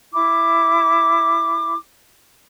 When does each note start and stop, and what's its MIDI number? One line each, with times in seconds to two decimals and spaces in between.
0.12 1.75 64
0.12 1.75 86